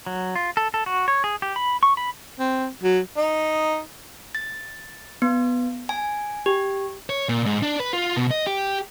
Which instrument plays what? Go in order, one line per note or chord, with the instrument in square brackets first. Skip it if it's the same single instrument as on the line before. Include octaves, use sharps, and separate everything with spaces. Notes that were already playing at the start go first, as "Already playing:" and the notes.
[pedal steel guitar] F#3
F4
A4
A4
F#4
C#5
G#4
G4
B5
C#6
B5
[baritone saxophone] C4
F#3
[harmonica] D#4
[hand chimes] A6
B3
G#5
G4
[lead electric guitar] C#5
A#2
G#2
D4
B4
F4
B2
D#5
G4